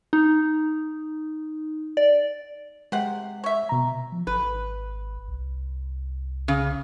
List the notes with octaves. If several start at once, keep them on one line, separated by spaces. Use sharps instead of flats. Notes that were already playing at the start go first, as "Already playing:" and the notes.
D#4
D5
C3 G#3 F#5
C#5 E5
B2 A#5
F3
G#1 B4
C2
C#3